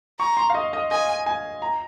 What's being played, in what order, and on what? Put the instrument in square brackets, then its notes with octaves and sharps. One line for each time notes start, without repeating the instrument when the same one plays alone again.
[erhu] A#5 [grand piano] C#6
[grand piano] C6
F5
D#5
D#5
[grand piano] D#5 [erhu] G#5
[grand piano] G#5
A#5